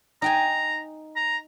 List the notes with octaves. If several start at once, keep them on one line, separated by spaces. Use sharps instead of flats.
D#4 G5 G#5 A#5
A#5